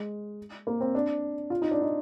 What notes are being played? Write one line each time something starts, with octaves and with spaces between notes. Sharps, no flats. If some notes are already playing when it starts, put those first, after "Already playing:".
Already playing: G#3
A#3
C4
D4
F4
D#4
D4
D#4